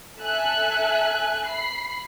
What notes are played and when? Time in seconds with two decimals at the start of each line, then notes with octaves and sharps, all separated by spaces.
0.19 A4 E5 G#5 F#6
1.45 B5 C7